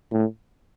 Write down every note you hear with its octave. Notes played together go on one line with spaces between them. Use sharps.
A2